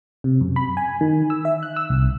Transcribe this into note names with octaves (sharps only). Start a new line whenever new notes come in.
C3
F#2
B5
G#5
D#3
E6
E5
F#6
E6
C2